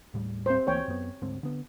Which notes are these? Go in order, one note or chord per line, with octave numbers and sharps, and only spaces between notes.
D#2 A2 G3
C4 C5
D2 E3 A#3 C#5 G5
F#2 B3
D2 G#2 C4
D3 B3